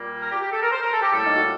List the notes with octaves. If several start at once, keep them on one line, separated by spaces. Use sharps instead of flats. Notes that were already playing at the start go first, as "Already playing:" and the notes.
Already playing: A#2 G3 A#3
A#4
G4
G4
A4
A#4
C5
A#4
A4
G4
A2 G3 A#3 A4
D#4
F#4